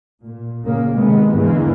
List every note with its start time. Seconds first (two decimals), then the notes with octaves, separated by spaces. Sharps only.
0.23 A#2
0.63 A#2 C#3 A#3
0.93 C3 D#3 G#3 B3
1.34 E2 G#2 D3 E3 A#3